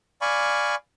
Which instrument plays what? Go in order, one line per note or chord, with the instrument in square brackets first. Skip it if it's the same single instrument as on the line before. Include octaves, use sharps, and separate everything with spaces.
[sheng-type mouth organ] D5 F5 G#5 B5 C#6